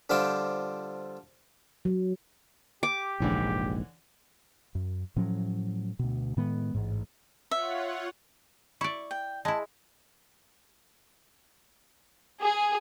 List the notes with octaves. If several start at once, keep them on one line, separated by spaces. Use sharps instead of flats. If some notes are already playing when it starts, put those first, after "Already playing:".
D3 F3 G3 F4 E5 G5
F#3
G4 D6
F1 A#1 G#2 D3 E3 C#4
F#2
A2 F3 F#3 C#4
D2 B2
A2 D#3 G#3 B3
A1 G#2
F4 C#5 E5 F#5
E4 D5 C#6
G5
G#3 E4 A5
G#4